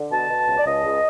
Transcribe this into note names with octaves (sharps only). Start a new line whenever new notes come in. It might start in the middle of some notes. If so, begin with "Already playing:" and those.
Already playing: D3
B2 A5
B2
C#2
D5
C#2 D#5
C#2